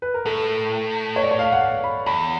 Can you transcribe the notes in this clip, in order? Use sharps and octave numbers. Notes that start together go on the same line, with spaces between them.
B4
A#4
A2 A4
C#5
D5
C#5
F5
F#5
F5
B5
E2 B5